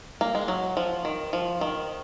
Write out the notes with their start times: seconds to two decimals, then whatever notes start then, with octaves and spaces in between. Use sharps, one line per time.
0.21 A#3
0.35 G#3
0.48 F#3
0.77 F3
1.05 D#3
1.33 F3
1.61 D#3